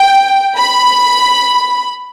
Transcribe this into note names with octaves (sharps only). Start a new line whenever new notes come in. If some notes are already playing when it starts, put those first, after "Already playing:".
Already playing: G5
B5